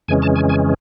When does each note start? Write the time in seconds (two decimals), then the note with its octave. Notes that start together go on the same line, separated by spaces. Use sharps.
0.08 F2 C#3 E3 G#3 C#4 G#5
0.22 A5
0.36 G#5
0.49 G#5